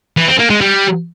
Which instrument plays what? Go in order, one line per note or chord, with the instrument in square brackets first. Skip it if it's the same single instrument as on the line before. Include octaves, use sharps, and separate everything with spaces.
[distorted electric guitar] E3
C4
A#3
G#3
G3